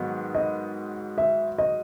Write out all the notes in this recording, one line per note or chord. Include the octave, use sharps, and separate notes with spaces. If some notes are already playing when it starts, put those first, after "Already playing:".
Already playing: G#2 D#3 F#3 B3
D#5
E5
D#5